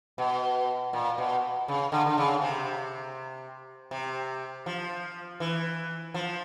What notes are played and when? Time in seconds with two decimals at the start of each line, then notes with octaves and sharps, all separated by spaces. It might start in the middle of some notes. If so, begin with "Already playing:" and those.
0.18 B2
0.93 A#2
1.18 B2
1.68 C#3
1.92 D3
2.06 D3
2.18 C#3
2.42 C3
3.91 C3
4.66 F3
5.40 E3
6.14 F3